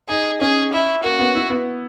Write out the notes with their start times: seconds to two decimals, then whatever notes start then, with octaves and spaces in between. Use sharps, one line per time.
0.09 D#4 G#4
0.41 C#4 G#4
0.73 E4
1.03 A#3 F#4
1.19 B3
1.35 E4
1.50 B3